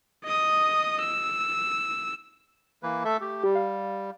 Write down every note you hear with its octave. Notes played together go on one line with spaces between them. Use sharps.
D#5 D#6
E6
E3 A#3 B4
A3 A4 E5
A3 G4
G3 G4
F5